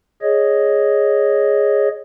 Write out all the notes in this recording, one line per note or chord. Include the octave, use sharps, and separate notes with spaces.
G#4 C#5 D#5